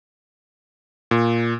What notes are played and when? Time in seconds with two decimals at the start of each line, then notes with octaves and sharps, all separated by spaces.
1.11 A#2